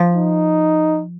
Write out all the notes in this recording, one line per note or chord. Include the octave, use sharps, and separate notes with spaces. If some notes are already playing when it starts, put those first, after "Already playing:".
Already playing: F3
D#4